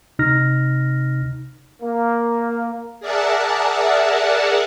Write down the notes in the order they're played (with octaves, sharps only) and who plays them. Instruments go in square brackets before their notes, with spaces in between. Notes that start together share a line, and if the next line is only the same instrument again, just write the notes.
[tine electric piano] C3 D#4 F6 A#6
[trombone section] A#3
[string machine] G#4 A#4 D5 E5 F#5 A5